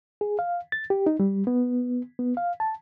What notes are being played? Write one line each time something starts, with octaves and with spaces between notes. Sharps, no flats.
G#4
F5
A6
G4
D#4
G3
B3
B3
F5
A5